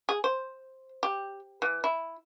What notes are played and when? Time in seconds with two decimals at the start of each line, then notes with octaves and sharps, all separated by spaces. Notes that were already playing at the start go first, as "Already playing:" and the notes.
0.09 G#4
0.24 C5
1.03 G4
1.62 E3
1.84 E4